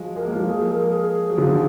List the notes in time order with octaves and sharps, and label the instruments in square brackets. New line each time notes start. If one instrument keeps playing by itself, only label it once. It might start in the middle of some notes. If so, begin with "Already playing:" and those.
Already playing: [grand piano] F3 F#3 G#3
[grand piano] G#3 [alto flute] A#4
[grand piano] A#3
F3 G#3
[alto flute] G#4
A#4
G#4
[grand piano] F#3
D3 F3
D#3